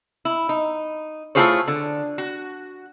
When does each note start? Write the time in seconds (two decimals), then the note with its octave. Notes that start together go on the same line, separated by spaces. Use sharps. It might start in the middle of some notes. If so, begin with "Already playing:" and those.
0.25 E4
0.49 D#4
1.35 A3 E4 F4 G#4 C5 C#5
1.68 D3
2.18 F#4